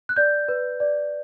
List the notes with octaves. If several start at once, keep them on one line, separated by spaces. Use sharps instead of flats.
F#6
D5 G6
B4
D5